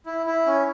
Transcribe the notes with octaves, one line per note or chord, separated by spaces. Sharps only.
E4
E4
C#4